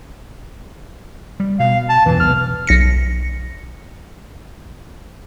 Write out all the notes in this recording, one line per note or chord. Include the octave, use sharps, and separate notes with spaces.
G3
B2 F5
A5
E2 G2 A#2 E3
B1 E2 C3 F6
B1 A#6 C#7